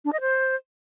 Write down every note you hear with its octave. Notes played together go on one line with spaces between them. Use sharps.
D4
D#5
C5